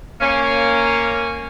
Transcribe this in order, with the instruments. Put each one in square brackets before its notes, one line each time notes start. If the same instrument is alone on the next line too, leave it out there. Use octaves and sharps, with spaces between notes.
[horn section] A#3 C#4